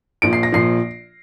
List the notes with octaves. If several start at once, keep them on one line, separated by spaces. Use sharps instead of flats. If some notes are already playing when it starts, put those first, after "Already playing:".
A#1 A#2 F3 D7
C7
A#6
A#1 A#2 F3 C7